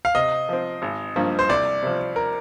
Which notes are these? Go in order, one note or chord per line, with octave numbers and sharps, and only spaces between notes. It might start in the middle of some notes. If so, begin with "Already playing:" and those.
F5
C3 D#5
F3 C4
G#1
G2 F3 A#3
C5
C2 D5
C3 F3
A#4